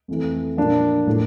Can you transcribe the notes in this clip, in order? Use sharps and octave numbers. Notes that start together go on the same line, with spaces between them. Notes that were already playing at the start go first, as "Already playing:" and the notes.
F2 E3 A3
A#2 F3 A#3 D4
A2 F3 A#3